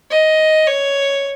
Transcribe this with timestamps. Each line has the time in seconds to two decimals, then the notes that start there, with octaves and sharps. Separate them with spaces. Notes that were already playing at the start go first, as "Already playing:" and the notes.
0.11 D#5
0.67 C#5